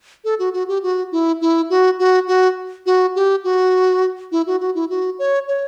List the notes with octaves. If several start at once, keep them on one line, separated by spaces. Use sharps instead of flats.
A4
F#4
F#4
G4
F#4
E4
E4
F#4
F#4
F#4
F#4
G4
F#4
E4
F#4
F#4
E4
F#4
C#5
C#5